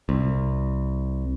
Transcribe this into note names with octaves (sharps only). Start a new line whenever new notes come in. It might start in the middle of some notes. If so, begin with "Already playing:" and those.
C2